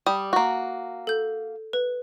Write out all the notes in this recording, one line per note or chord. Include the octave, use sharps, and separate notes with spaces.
G3 D#6
A#3 F#4
A4 G6
B4